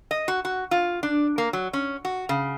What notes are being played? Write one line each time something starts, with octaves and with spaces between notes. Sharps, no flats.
D#5
F#4
F#4
F4
D4
A#3
F#3
C#4
F#4
C#3